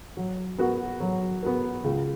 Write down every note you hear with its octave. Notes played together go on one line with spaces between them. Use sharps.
F#3
B3 F#4 A#4
F#3
B3 F#4 A#4
C#2